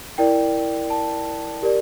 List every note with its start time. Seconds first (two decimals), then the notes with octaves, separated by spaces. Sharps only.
0.18 E4 A#4 D5 G5
0.90 A5
1.62 G4 A#4 D5